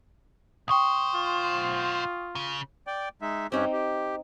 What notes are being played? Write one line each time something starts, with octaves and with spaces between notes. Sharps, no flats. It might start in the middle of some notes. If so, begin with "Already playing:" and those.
B1 C5 G5 C#6 D#6
F4
C#3
D5 G5
G#3 D#4 E5
G2 C4 C#4 D#4 G4
G4